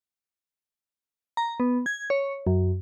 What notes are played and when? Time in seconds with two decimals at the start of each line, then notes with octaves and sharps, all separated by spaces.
1.37 A#5
1.60 B3
1.86 G#6
2.10 C#5
2.47 F#2